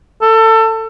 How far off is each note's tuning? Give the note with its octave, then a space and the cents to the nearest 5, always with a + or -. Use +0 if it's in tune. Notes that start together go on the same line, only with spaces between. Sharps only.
A4 +25